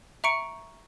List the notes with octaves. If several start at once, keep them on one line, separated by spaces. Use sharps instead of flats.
E5 A#5 C#6 C#7 D7